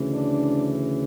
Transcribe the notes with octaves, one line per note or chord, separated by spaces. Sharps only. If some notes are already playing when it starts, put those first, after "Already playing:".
Already playing: D2 C#3 E3
D4